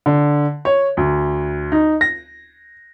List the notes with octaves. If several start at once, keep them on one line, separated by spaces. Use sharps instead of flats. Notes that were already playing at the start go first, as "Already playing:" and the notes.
D3
C#5
D2
D#4
A#6